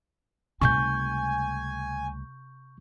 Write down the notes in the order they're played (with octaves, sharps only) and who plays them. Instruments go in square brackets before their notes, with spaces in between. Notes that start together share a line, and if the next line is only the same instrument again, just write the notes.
[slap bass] C#2 G3 A3 [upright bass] C3 D#4 [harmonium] G#5 [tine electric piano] C#6 G6